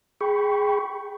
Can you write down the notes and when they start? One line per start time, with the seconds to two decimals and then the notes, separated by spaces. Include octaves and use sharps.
0.21 G#4 G5 B5 C#6